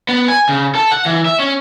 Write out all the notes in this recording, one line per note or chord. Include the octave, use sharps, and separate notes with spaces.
B3
G#5
C#3
A4
F#5
E3
E5
C#4